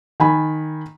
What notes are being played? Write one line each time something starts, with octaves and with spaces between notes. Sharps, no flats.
D#3 G#5 B5